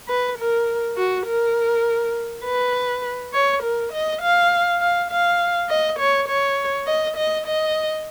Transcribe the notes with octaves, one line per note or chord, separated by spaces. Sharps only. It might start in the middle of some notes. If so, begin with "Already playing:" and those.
B4
A#4
F#4
A#4
B4
C#5
A#4
D#5
F5
F5
F5
D#5
C#5
C#5
D#5
D#5
D#5